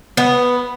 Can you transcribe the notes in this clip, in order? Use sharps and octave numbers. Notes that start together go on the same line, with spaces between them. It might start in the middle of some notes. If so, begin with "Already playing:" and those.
B3